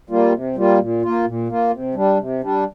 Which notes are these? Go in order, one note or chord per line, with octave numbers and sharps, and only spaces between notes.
G3 A#3 F4
C3
G3 A#3 F4
A#2
A#3 F4
A#2
A#3 F4
C3
G3 D4
C3
G3 D4